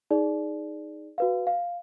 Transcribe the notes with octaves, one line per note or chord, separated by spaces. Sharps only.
D#4 G#4 D5
F#4 B4 F5
F5